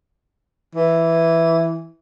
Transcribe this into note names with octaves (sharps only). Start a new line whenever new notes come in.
E3